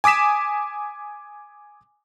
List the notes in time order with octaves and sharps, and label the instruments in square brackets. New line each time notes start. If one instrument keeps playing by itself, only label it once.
[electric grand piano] G#5 D6 D#6 B6 E7